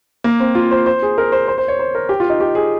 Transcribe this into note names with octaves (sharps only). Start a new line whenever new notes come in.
A#3
C4
F4
C5
C5
G#4
A#4
C5
C5
C5
C#5
C5
A#4
G4
F4
D#4
G4
G#4